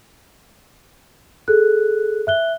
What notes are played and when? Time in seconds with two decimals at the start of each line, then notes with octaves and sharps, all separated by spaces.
1.48 G#4 A4 F#6
2.27 E5 F#6 G7